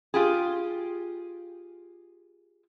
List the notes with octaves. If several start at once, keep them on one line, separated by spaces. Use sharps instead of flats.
F4 G4 G#4